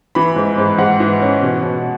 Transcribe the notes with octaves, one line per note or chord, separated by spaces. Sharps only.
E3 B5
G#2
G#2
G#2 F#5
E3
C#4
B2
B2